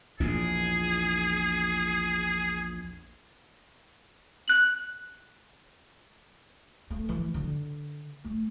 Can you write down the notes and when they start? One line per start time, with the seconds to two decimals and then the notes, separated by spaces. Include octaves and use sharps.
0.20 A#1 E2 A#2 G#4
4.48 F#6 F#7
6.90 A3
7.09 E3
7.34 D3
8.24 A3